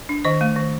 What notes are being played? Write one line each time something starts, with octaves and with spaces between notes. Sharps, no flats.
D4
D#3 D#5
A3
D#3